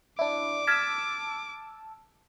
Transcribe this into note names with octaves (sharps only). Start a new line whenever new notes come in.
D4 E4 D6
A5 E6 F6 G#6 B6